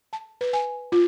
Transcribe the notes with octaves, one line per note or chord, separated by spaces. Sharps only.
A5
B4
G#5
F4